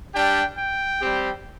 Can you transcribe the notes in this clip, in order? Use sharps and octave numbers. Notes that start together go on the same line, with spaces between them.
G3 D4 G4 G5
G5
G3 C4 G4